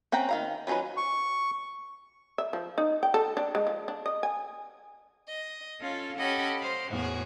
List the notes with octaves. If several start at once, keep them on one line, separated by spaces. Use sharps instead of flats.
C4 C#4 F#5 G5 A#5
D#3 F5 A#5
F3 F#3 C#4 D#4 B4
C#6
E5
F3
D#4
G5
A4
D4
G#3
F3
D4
D#5
G#5
D#5
C#4 F4 A4 F5
C#4 G4 A4 D#5 F#5 B5
C5 F5
E2 A2 F#4 G#4